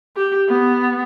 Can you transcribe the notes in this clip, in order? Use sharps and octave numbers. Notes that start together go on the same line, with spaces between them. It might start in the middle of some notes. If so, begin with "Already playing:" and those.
G4
B3